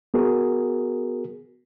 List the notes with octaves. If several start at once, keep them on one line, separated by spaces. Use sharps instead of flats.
B3 F#4 G#4 A#4